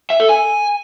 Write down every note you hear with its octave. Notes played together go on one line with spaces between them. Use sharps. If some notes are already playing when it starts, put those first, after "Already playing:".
E5
A4
G#5